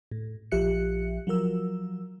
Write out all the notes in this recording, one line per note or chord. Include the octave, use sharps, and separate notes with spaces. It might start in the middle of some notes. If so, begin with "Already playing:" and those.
A2
A#1 F3 G4 E5 F#6 C#7
F3 F#3 A#4 E6